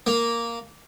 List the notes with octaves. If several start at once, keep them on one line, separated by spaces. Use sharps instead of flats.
A#3